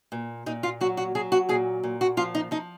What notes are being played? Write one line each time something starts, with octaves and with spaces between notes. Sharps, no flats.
A#2
A#2 D#4
F4
F#3 F#4
F#4
F#3 G#4
F#4
A#2 G#4
A#2
F#4
F3 F4
D#4
F3 D#4